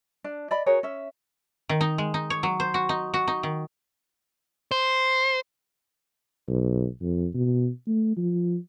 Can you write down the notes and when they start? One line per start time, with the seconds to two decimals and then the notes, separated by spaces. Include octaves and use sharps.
0.24 D4
0.51 D5 D#5 B5
0.66 F#4 G#4 A#4 C#5
0.83 C#4 E5
1.69 D#3
1.81 D#4
1.98 G#3
2.14 D#4
2.30 C#5
2.43 F#3
2.60 C5
2.74 F#4
2.89 D#4
3.14 F#4
3.28 D#4
3.43 D#3
4.71 C5
6.48 B1
7.01 F2
7.34 B2
7.87 A3
8.17 F3